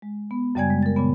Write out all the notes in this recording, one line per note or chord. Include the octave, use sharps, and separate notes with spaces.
G#3
B3
F#2 C#3 G3 D5 G#5 G#6
G#3
A#4 A6
A#2 C#3 B3